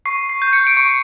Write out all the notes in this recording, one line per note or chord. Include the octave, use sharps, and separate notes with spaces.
C#6 C7
C7
G6
C#7
D7
C#6 C#7